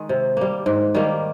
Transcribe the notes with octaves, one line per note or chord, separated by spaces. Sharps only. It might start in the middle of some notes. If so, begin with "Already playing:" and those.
Already playing: D#3 G#3
C3
G3 A#3
G#2
D#3 G3 A#3